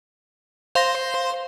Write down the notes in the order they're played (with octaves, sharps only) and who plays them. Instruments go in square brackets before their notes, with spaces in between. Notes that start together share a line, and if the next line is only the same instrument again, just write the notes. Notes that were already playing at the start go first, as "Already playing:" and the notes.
[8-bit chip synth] C5 C6 [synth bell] F5 A#6